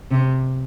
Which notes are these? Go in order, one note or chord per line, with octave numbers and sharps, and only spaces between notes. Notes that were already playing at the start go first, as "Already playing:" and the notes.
C3